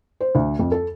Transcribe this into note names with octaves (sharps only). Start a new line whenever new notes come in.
C5
D2
F2
A4